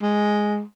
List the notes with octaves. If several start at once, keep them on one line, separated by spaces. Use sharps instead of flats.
G#3